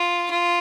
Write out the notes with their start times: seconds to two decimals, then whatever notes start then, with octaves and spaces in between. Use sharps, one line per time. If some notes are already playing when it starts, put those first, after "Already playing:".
Already playing: F4
0.30 F4